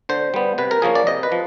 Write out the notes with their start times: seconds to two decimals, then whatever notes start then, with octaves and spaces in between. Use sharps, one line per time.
0.09 D3 C5
0.34 G3 B3
0.58 C3 B4
0.71 A#4
0.82 F3 A#3 C#4 G#4
0.95 D5
1.07 C3 D#5
1.23 B4
1.32 F3